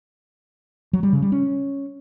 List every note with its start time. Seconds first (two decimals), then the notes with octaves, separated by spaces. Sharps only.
0.93 F#3
1.03 G3
1.13 C#3
1.22 G3
1.32 C#4